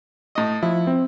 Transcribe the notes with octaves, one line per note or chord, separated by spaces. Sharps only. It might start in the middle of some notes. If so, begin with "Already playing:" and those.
A2 D#5
F3 E4
C4